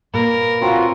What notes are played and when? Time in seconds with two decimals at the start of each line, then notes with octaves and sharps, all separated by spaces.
0.14 A#2 A#4 B4
0.62 C4 F4 F#4 C#5 A#5